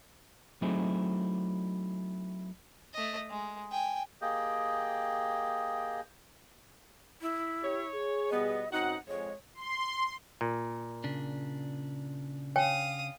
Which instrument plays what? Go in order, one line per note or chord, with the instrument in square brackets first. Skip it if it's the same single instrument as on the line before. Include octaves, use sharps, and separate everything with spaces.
[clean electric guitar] F#3 A3 C4 D#4 E4 G#4
[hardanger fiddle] A3 D#5
G#3
G5 G#5
[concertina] A#3 G4 G#4 D#5 G5
[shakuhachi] E4
[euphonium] G4 [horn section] C#5
[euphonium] G#4
[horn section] B2 G3 B3 [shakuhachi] D#5
[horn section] F#2 C4 F#5 [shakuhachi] D#4 [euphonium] F#4
[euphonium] F2 [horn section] G#3 [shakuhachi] C#5
[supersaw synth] C6
[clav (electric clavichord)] A#2
[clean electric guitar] C#3 D4
[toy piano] C#5 G5 G#5 [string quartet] F5 D#6